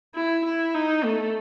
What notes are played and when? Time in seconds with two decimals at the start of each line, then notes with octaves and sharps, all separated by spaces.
0.15 E4
0.44 E4
0.74 D#4
1.04 A3